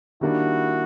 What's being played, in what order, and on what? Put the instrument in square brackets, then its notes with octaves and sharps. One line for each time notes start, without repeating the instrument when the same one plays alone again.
[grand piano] D#3 G3 A#3 D4 [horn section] E4 F#4